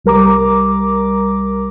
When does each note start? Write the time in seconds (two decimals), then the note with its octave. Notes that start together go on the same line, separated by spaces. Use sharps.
0.04 C2 G3 A#4 A#5 D6